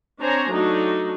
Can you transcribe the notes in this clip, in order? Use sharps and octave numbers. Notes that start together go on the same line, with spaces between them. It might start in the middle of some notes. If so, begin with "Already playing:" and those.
C4 D4 C5 C#5 G#5 A#5
F#3 A3 D4 D#4 F#4